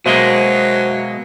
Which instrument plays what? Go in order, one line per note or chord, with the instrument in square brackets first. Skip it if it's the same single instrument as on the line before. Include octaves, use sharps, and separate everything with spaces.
[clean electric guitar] B2 G#3 A#3 [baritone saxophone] F#3 [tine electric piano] C5 E5 F5